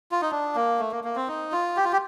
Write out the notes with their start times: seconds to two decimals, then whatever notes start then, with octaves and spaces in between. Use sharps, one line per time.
0.12 F4
0.22 D#4
0.31 D4
0.56 A#3
0.79 A3
0.92 A#3
1.04 A#3
1.16 C4
1.28 D#4
1.52 F4
1.77 G4
1.84 F4
1.93 G4